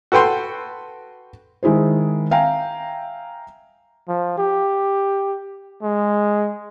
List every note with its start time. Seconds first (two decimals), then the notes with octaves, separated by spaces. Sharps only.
0.12 F#4 A4 B4 G5 C6
1.63 D#3 G#3 E4 G#4 C5
2.31 E5 F5 G5 G#5 A#5
4.09 F3
4.38 G4
5.83 G#3